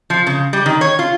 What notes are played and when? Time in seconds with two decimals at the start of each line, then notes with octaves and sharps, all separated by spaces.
0.10 F3
0.27 C#3
0.53 G3
0.66 D#3
0.81 C#5
0.99 F4